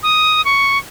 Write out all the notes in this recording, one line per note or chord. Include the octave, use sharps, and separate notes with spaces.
D#6
C#6